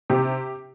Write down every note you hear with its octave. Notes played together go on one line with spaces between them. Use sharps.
C3 G4